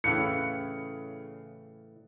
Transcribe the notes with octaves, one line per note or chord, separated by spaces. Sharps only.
A2 C#3 E3 F5 F#6 C#7